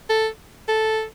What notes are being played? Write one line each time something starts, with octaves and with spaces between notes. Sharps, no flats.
A4
A4